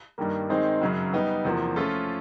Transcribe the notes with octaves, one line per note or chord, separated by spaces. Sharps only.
G2 D#3 G3 A#3
D#3 G#3 C4 D#4 G#4
F#2 C#3 F#3
G3 B3 D#4
E2 C3 F3 A#3
F3 A3 C#4 F4 A4